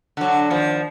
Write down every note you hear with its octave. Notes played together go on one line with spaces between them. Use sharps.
D3 F#3
D#2 F3